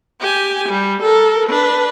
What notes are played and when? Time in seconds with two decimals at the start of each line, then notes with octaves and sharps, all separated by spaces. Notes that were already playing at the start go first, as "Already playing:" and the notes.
0.21 G4 G#5
0.69 G3
1.03 A4 A#4
1.50 D4 B4